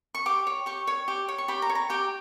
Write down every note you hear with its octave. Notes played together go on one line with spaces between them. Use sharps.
C#6
G4 D6
C#5
G4 C#6
C#5
G4
C#5
C#6
G4 B5
A#5
C#5
A#5
G4 G5